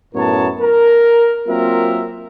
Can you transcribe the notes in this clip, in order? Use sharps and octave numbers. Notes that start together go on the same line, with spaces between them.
F#2 A2 B3 A#4 C#5 A5
A#4
F#3 A#3 C4 F4 A#4 E5